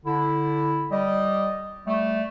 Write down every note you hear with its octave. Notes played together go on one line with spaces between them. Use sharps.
D3 E4
G3 D#5
G3 A3